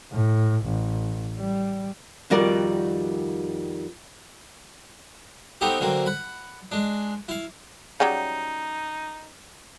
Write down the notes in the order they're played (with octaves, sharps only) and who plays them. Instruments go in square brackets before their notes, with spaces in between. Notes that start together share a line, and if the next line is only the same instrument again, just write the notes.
[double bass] A2
A1
G3
[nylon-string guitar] F2 D#3 G3 F#4 A#4 D5
[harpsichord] B3 C4 D#4 G4 A4
D3 F#3 A#3 C4
F#5 B5
G#3 D4
E4 F5
[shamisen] C#3 F#3 G3 [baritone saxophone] D#4